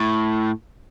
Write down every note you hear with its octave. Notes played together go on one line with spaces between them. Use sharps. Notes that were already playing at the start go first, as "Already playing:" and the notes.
Already playing: A2